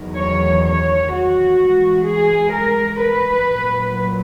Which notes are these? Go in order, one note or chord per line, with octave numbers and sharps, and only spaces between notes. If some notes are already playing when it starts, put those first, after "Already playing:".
Already playing: E2 D#3 F#3
C#5
C#5
F#4
G#2 E3
G#4
A#4
B4
A#2 F#3